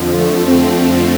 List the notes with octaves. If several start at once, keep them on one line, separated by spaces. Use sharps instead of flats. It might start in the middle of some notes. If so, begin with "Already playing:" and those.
Already playing: F2 D3 F3
A3
C4